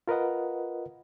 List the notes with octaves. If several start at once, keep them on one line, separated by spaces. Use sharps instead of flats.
F4 A#4 B4 D#5 F#5